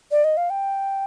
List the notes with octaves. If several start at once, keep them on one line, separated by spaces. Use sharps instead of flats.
D5
D#5
F5
G5